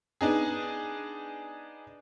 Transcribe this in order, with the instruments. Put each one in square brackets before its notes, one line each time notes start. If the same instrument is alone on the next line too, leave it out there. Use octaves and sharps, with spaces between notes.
[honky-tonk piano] B3 D4 D#4 G#4